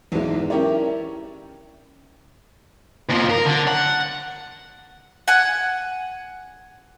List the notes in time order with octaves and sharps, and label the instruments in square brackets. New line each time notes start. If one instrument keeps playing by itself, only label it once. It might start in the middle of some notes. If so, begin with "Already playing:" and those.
[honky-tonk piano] B1 E2 G#2 E3 G#3 E4
C#4 E4 G4 A#4 C#5 D5
[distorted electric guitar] D#2 F3
A#4
D3
F#5
[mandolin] F#5 G#5